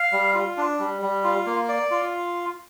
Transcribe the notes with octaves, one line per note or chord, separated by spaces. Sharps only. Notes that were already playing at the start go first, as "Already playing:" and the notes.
Already playing: F5
G3
F4
D4
G3
G3
F4
A#3
D5
F4